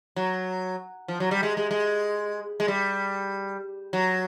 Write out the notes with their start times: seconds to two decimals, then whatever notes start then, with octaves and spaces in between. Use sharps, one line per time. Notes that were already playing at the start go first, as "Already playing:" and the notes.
0.16 F#3
1.08 F3
1.20 F#3
1.31 G3
1.43 G#3
1.57 G#3
1.71 G#3
2.60 G#3
2.68 G3
3.93 F#3